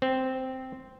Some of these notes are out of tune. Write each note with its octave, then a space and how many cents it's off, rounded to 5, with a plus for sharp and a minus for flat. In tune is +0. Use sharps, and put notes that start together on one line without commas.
C4 -5